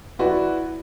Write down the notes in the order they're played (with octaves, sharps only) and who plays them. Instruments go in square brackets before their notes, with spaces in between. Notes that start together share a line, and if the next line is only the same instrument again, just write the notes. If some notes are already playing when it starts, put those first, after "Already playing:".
[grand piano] E4 F#4 B4 D5